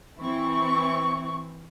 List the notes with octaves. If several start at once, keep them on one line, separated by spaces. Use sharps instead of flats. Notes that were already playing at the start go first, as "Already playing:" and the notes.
E3 C4 E4 C#6